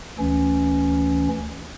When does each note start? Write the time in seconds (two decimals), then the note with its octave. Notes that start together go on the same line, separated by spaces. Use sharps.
0.19 D2 E3 C#4